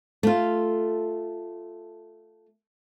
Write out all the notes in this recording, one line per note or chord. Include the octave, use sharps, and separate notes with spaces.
A3 F4